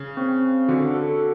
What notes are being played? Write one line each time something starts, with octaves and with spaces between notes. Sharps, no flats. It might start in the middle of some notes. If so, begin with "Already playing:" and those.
Already playing: C#3
C4
C4
D3 F#4
A4